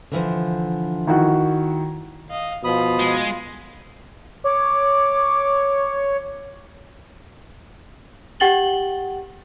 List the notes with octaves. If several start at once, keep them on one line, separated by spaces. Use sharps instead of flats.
D3 E3 F3
D#3 E4 F#4
D#5 F5
B2 F3 F4 B5 D#6
G#3
C#5 D6
G4 F#5 G5 A6 F#7 G7